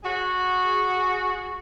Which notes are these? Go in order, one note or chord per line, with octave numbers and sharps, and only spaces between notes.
F#4 G#4